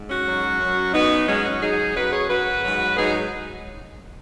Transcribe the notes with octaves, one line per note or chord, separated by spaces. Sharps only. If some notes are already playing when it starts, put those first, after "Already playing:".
Already playing: G#2
C#4 F#4
G#2 F#3
F#2 F#3
F#2 F#3 B3 D#4
G#2 F#3 G#3 C#4
C#4 F#4
G#2 F#3 D#4 G#4
F#2 F#3 F#4 B4
G#4 C#5
F#2 F#3 F#4 B4
G#2 F#3
G#2 F#3 D#4 G#4